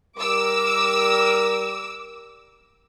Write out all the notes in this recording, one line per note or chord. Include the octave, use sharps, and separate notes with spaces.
G3 A#4 D6 E6